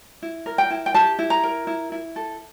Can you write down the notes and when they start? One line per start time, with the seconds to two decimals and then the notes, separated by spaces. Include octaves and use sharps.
0.22 E4
0.46 A#4
0.58 G5
0.70 E4
0.86 G5
0.94 G4 A5
1.19 E4
1.30 A#5
1.43 A#4
1.67 E4
1.92 E4
2.16 A4